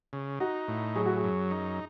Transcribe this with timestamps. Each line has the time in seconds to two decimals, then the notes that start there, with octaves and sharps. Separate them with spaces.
0.13 C#3
0.40 D#4 F#4
0.68 A2
0.96 F#3 G#4
1.06 F#4
1.16 G#4
1.23 F#2
1.51 D#4